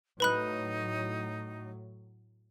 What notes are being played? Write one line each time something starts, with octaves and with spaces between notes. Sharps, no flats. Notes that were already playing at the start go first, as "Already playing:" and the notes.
A2 F#3 D#4 B4 B5 F#6